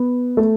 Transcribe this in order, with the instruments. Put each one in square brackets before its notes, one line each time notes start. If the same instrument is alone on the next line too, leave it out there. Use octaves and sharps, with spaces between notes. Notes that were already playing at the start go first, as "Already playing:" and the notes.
Already playing: [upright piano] B3
A3